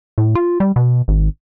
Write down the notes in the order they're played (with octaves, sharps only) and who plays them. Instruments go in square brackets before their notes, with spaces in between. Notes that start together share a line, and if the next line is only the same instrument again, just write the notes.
[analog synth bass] A2
F4
G3
B2
G#1